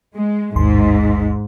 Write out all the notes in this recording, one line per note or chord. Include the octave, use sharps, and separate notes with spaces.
G#3
A1 D#2 G#2 C6